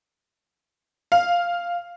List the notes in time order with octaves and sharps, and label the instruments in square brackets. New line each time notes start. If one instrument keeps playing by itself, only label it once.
[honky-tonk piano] F5